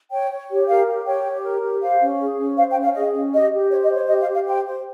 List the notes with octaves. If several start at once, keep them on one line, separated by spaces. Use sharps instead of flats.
C#5 G5
C#5
G4
A#4 F5
G4
C#5 G5
G4
A#4
G4
C5 F5
C#4
G#4
C#4
C5 F5
G5
C#4
F5
G#4 D#5
C#4
G4 D#5
G4
C5 C#5
D#5
C5
C#5
G4 D#5
F5
G4
F5
C5 G5
C5